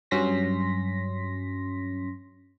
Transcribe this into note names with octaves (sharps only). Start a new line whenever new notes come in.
G2 F#3 C#4 C6 A#6 B6